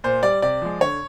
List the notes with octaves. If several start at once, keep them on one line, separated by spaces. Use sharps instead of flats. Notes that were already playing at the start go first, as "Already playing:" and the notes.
A#2 C5
G3 D5
C3 D5
F3 G#3
D3 C#5